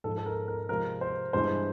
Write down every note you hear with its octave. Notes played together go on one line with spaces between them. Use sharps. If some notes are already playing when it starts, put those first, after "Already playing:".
G#2 F3 G#3 A4
A4
A#4
A#4
C3 F3 G#3 A#4
C5
G2 E3 G#3 C5